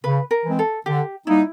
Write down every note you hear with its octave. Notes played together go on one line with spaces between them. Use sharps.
C#3 B4
A#4
E3 G#3 C4
A4
D3 G4
G3 A#3 D#4 E4